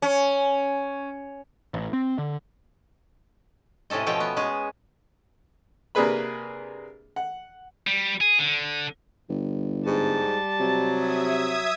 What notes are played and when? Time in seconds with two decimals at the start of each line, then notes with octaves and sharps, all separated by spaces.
0.02 C#4
1.74 A1
1.93 C4
2.18 D3
3.90 A2 C3 C#4 A4 D#5
4.06 B2 F3 A3 A4 C#5 G5
4.20 B3
4.36 G#3 C#4 G#4
5.95 C3 A#3 D4 G#4 B4 B5
7.16 F#5
7.87 G3
8.21 G#4
8.39 D3
9.29 G1
9.86 G#2 G3 A5
10.60 C3 F#3
10.92 E5 D#6 G#6